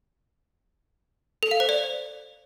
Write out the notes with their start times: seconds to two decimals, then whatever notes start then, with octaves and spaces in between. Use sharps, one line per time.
1.43 A4
1.51 F5
1.60 C5
1.69 D5